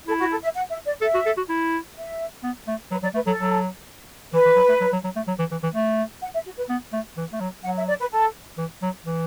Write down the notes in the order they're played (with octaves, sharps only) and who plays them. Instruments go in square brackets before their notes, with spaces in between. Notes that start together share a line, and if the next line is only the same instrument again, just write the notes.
[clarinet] E4 [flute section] A4
[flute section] F#4
A4
E5
F#5
E5
D5
[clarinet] A4 [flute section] E5
[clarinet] F#4
A4
F#4
E4
[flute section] E5
[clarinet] B3
A3
[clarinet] F#3 [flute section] B4
[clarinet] F#3 [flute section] D5
[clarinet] A3 [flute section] B4
[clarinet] F#3 [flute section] A4
[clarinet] F#3
[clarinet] E3 [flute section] B4
[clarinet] E3
F#3
A3
F#3
F#3
F#3
A3
F#3
E3
E3
E3
A3
[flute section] F#5
E5
F#4
B4
[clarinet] B3
A3
E3
A3
F#3
[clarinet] F#3 [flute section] F#5
[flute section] E5
D5
B4
A4
[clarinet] E3
F#3
E3